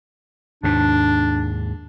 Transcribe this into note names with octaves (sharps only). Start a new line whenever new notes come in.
D#2 G#2 D4